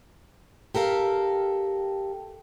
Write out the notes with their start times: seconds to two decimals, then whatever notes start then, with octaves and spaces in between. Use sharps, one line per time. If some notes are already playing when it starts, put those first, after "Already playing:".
0.75 G4 A4 A#4 F5